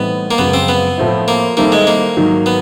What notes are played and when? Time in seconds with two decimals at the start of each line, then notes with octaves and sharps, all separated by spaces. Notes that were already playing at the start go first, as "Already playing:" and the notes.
Already playing: A2 E3 G3 B3 C4 D#4
0.31 A#3
0.38 F#2 C#3 F3 G#3 B3
0.54 C4
0.68 B3
0.98 A2 F3 A3 C4 E4
1.28 A#3
1.57 D#3 G3 A#3 C4 E4 A4
1.72 G#3
1.87 A#3
2.17 G#2 D#3 F#3
2.46 B3